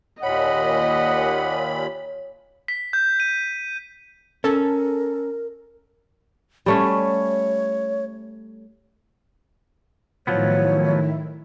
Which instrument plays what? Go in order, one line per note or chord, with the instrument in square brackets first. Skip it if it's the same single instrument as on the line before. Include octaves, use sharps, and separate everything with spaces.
[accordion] D#2 A#2 B5 [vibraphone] C#5 [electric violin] D#5 [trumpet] F#5
[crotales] B6
G6
D#7
[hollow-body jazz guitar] C#4 [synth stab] A4 [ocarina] A#4
[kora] G3 A3 C#4 [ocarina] C#5
[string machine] A2 D#3 E4 [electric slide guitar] F3 F#3 B3 [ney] C#5